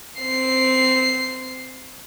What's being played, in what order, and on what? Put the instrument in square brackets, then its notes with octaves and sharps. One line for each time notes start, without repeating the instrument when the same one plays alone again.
[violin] C4 C7